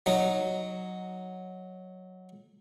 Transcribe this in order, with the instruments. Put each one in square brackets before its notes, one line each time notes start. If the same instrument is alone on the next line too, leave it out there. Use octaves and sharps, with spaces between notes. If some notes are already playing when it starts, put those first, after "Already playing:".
[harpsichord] F#3 D#4